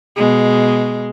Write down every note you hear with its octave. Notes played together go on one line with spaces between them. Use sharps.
B2 G#3